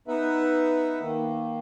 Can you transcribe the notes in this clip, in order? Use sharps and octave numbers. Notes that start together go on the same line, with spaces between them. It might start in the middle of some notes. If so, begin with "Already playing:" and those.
B3 D#4 B4 E5 F#5
D#3 A#3